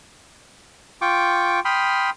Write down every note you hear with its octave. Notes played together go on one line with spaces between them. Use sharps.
F4 G5 C#6 D6
G5 B5 C6 D#6 F6